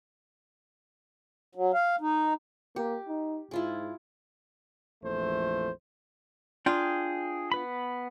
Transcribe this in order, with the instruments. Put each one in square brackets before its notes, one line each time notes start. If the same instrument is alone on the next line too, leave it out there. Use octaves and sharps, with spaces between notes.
[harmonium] F#3
F5
D#4
[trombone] A#3 [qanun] G4
[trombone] D#4
[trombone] G#2 [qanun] E4 F4 G#4
[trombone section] A#1 F2 E3 A3 C5
[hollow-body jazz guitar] D4 F4 [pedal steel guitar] G#4 G5
[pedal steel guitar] B3 B4 B5